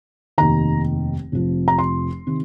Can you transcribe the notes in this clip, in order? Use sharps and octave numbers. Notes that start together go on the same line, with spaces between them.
F1 D#2 D#3 A#5
F1 F2 F3
A#5
C6
C3 D#3